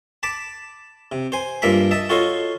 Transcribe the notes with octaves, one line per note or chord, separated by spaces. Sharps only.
A5 B5 D6
C3
C5 G#5
G2 F3 A#3 E5 A#5 B5
D#5 E5 A5
F4 F#4 A4 C#5 D#5 F5